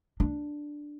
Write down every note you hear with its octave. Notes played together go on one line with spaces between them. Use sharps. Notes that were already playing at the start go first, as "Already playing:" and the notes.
D4